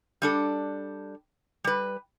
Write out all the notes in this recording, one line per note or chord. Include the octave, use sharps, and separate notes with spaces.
G3 D4 A4
G3 B4